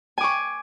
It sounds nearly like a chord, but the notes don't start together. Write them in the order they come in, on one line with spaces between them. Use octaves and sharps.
G#5 D6 C#6